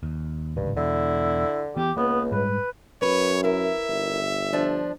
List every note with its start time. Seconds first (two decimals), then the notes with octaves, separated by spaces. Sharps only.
0.03 D#2
0.56 D1 G#1 C#2 G2
0.77 E2 B2 D3 E4
1.77 E3 B3 G4
1.97 C#2 A#3 B3
2.32 G#2 G3 G#3 B4
3.02 F#2 B4 C#5
3.43 E4 A#4 E5
3.88 G1
4.53 F3 D4